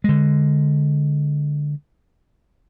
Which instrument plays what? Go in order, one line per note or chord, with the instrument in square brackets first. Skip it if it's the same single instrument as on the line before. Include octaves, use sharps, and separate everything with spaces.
[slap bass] D3 G#3